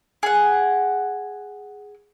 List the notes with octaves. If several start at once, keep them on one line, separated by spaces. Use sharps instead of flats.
G#4 F#5